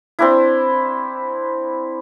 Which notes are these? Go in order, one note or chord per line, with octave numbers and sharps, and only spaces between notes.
C4 D4 E4